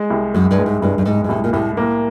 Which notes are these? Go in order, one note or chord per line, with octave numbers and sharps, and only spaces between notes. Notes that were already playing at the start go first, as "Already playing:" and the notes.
Already playing: G#3
C2
F#2 G#3
G2
G#3
G#2
C2 G2
G2
G#2 G#3
G#2
C2 A2
A#2
C2 A2
A2 A#3